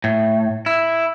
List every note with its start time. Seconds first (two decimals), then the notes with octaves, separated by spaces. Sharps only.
0.04 A2
0.66 E4